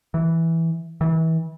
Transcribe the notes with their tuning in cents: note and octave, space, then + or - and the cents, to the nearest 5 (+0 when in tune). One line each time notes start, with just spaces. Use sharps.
E3 -5
E3 -30